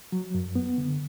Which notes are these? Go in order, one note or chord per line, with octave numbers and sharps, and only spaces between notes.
F#3
F#2
B3
D3